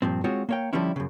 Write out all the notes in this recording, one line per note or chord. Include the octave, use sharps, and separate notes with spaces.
G2 A#2 F3 C4
G#3 C4 F4 F#4 C#5
A#3 C#5 G5
D3 F3 G3 G#3 C#4 E4
F#2 C#3